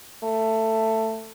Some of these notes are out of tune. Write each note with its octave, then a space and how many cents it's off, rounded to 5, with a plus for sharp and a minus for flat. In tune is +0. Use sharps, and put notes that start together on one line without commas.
A3 +15